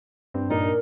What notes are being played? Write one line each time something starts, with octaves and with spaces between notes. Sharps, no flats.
G2 C4
A#2 D4 D#4 A#4 D5